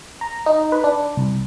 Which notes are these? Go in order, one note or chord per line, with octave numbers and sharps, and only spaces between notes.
A#5
D#4
B4
D4
C2